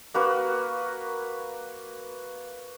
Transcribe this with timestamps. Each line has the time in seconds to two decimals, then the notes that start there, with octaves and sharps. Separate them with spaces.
0.14 A#3 F#4 B4